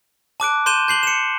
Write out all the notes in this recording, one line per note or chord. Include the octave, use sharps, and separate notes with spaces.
A5 D6 F#6 D7
C6 G6 D#7 E7 G7
G6 C7 F#7 G7
C#7 E7